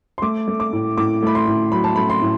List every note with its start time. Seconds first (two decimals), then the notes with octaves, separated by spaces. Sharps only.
0.18 C6
0.22 A3 D6
0.48 A3
0.60 D6
0.73 A2
0.97 A2 D6
1.23 A3 B5
1.35 C6
1.47 A2
1.72 F#3 B5
1.84 A5
1.96 A3 B5
2.10 C6
2.22 A2